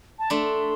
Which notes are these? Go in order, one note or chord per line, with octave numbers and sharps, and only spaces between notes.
A5
A3 D4 C6